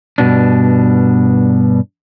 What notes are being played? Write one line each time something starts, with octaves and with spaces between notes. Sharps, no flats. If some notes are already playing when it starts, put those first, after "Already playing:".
G2 B2 D4